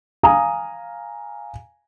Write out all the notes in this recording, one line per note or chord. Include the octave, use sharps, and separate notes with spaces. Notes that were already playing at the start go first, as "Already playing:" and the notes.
F5 G#5 A#5 D#6